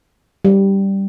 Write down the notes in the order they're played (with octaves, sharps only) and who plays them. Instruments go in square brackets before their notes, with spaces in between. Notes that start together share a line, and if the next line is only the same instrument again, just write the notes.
[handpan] G3